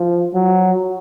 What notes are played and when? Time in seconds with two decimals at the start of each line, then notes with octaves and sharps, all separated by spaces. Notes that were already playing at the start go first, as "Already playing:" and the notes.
Already playing: F3
0.34 F#3